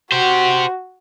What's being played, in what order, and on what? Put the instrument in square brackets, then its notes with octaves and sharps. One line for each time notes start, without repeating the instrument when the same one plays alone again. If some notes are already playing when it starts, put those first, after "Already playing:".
[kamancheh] F#4 [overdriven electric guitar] G4 C5